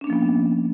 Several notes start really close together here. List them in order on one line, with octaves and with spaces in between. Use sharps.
C#4 D4 A#3 F3 B3